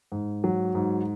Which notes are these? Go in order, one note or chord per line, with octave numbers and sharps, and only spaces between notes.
G#2
F#3
G#2